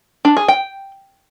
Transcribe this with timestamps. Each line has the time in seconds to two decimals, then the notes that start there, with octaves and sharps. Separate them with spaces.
0.25 D4
0.37 G#4
0.48 G5